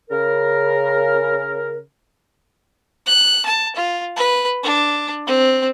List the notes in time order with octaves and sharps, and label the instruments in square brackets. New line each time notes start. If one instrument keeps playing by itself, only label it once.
[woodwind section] C#3 A#4
[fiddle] F#6
A5
F4
B4
D4
C4